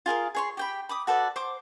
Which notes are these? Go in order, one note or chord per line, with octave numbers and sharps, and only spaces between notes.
F4 G#4 A#4 F5
G#4 C#5 C6
G4 G5 B5
B5 D6 D#6
F#4 A4 B4 D5
C5 D6